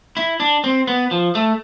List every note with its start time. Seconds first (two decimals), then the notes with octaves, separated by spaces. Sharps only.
0.17 E4
0.40 D4
0.64 C4
0.87 B3
1.11 F3
1.35 A3